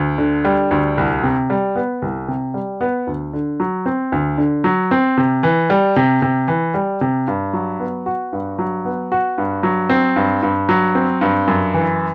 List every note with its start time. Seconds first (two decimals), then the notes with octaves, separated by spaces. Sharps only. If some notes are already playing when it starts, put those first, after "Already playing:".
Already playing: D2
0.18 D3
0.45 G3
0.71 D2
0.98 C2
1.23 C3
1.50 G3
1.76 B3
2.02 C2
2.28 C3
2.54 G3
2.81 B3
3.07 D2
3.33 D3
3.60 F#3
3.86 C4
4.12 D2
4.38 D3
4.64 F#3
4.91 C4
5.17 C3
5.43 E3
5.70 G3
5.96 C3
6.22 C3
6.48 E3
6.74 G3
7.01 C3
7.28 G2
7.53 F#3
7.80 B3
8.06 F#4
8.33 G2
8.59 F#3
8.85 B3
9.12 F#4
9.38 G2
9.63 F#3
9.90 C4
10.16 G2
10.43 G2
10.69 F#3
10.95 C4
11.21 G2
11.47 F#2
11.74 E3